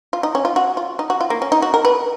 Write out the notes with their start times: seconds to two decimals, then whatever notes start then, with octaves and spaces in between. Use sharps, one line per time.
0.13 F4
0.23 D#4
0.35 C#4
0.45 F4
0.56 F#4
0.77 F4
0.99 D#4
1.10 F#4
1.21 F4
1.30 A#3
1.42 C#4
1.52 D#4
1.62 F#4
1.74 A#4
1.85 B4